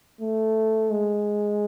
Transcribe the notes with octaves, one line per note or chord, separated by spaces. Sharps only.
A3
G#3